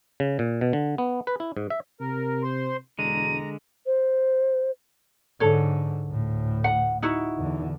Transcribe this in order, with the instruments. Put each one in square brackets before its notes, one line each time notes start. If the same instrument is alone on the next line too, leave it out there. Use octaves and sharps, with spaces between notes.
[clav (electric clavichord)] C#3
A#2
B2
D3
B3
B4
E4
G#2
E5
[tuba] C3 [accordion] A#4
[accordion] C5 C6
[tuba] E1 [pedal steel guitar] D3 G#3 [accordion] A#5 [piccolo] D#7
[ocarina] C5
[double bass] G#2 D3 [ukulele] A4 C#5
[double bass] D2 A2
[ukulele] F#5
D#4 E4 F#4
[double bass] E2 D3